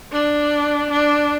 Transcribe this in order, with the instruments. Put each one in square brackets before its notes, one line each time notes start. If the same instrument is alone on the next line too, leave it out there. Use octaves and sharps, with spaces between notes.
[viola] D4
D4